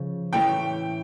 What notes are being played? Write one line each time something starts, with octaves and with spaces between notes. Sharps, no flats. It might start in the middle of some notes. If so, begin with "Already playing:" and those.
Already playing: C#3 F3
A2 E3 A3 C#4 E4 G5